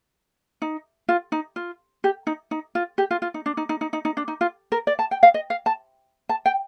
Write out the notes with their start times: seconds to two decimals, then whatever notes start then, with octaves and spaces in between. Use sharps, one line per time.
0.62 D#4
1.09 F4
1.32 D#4
1.56 F4
2.04 G4
2.27 D#4
2.51 D#4
2.75 F4
2.98 G4
3.11 F4
3.22 F4
3.34 D#4
3.46 D4
3.57 D#4
3.69 D#4
3.81 D#4
3.93 D#4
4.05 D#4
4.17 D4
4.28 D#4
4.41 F4
4.72 A#4
4.87 D5
4.99 A5
5.11 G5
5.23 F5
5.34 D#5
5.50 F5
5.66 A5
6.29 A5
6.46 G5